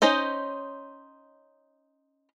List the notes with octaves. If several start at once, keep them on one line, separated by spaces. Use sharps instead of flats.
C#4 D#4 C5 D#5